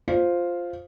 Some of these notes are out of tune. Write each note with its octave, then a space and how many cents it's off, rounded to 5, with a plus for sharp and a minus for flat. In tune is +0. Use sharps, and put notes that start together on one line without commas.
F4 +0 C5 +0